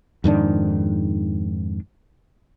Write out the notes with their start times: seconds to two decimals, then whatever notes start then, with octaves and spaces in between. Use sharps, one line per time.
0.24 F2 G#2 D#3 D4